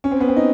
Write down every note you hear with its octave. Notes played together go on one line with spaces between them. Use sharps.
C#4
C4
B3
C4
D#4